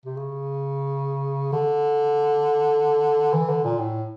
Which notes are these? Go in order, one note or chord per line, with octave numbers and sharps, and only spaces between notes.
C3
C#3
D3
E3
D3
A#2
A2